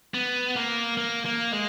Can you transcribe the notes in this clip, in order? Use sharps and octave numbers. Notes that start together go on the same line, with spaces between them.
B3
A#3
A#3
A#3
G#3